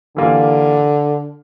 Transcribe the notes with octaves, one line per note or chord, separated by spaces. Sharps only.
D3 E3 G3 A#3 F4